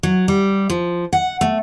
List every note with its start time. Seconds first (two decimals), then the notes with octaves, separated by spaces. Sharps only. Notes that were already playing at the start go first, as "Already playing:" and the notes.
0.03 F#3
0.28 G3
0.70 F3
1.13 F#5
1.41 A3